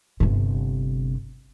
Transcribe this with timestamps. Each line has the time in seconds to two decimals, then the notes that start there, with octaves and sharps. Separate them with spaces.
0.20 G1 C3